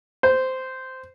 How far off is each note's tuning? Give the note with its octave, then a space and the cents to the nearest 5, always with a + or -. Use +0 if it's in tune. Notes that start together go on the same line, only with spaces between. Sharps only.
C5 -10